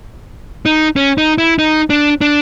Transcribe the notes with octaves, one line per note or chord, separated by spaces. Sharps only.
D#4
C#4
D#4
E4
D#4
D4
D4